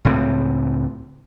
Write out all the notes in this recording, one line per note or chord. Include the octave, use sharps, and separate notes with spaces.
C#2 A2 C4